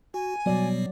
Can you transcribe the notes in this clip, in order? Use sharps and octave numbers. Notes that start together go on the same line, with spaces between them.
F#4 G#5
B2 F#3 G3 B3 D5